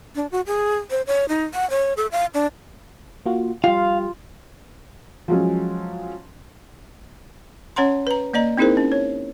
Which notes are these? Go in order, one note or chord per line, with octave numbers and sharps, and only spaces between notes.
D4
F#4
G#4
C5
C#5
D#4
F#5
C#5
A4
F5
D4
A#3 F4 F#4
G3 F4 G4 F5
F3 F#3 G#3 C#4
C#4 C#5 F#5 A#5 C6
B4 A#5
A#3 D5 D#5 A#5
C4 D#4 E4 G#4 A#4 C5
C#4
C#5